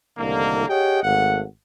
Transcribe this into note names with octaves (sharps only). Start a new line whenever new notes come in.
C2 A2 D3 D#3 A#3
G4 G#4 C#5 D#5 F#5 G5
G#1 A3 F5 F#5